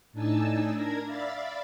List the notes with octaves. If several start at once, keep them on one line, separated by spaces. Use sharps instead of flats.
A2 D4 D#4 G#5 A5 E6
D4 A#4 G#6 A#6
D5 E5 F5 B5 A6